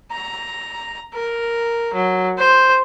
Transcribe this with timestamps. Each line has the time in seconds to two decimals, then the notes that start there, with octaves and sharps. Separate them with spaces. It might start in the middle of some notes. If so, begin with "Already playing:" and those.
0.11 A#5
1.14 A#4
1.93 F#3
2.38 C5